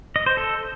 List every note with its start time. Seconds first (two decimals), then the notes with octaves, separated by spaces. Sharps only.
0.16 D#5
0.26 C5
0.37 A4